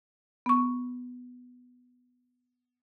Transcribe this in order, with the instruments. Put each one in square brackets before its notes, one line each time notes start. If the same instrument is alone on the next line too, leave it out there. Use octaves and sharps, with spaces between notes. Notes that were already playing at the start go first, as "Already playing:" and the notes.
[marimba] B3 C#6